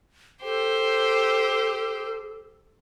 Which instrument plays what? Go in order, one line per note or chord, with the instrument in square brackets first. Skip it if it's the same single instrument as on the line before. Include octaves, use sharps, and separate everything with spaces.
[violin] G4 C5 [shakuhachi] A4